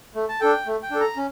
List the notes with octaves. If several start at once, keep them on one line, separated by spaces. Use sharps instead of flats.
A3
A5
D4 A4 G5
A3
G5
D4 A4
A#5
C#4